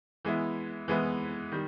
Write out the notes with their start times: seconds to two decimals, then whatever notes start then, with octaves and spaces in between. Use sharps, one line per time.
0.25 E3 G#3 B3 E4
0.88 E3 G#3 B3 E4
1.52 D#3 G3